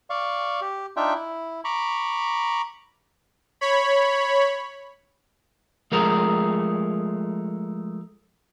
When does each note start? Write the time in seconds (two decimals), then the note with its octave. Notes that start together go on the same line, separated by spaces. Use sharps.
0.10 D5 F5 C#6
0.61 G4
0.97 D4 D#4 F4 E5 G5
1.15 E4
1.64 A#5 B5 C#6 D6
3.61 C#5 B5
5.92 F3 G#3 A3 A#4